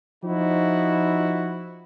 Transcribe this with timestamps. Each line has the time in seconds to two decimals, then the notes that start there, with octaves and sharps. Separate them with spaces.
0.24 F3 D#4 E4 F#4